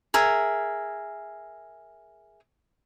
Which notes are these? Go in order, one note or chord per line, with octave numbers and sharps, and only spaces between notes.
G#4 A#4 E5